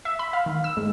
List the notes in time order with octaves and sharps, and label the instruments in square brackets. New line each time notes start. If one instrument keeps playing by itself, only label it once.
[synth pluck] E5
B5
F5
D#3
E6
G#2